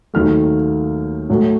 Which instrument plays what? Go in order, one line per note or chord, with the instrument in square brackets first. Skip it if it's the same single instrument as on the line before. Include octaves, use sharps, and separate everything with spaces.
[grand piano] D#2 D#3 F#3 A3 F6
A2 F#3 A3